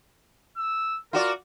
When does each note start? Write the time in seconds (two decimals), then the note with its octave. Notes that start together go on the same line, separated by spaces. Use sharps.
0.57 E6
1.13 F4 F#4 A#4 D5